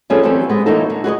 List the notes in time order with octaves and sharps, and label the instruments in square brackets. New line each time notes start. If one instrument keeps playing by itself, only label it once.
[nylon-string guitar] F3 G3 B3 C#4 G#4 A4
E3 F#3 C4 C#4 G4 A4
G#3 B3
E3 F#3 A#3 B3 D#4 A4
D3
F#4 G#4 B4 D#5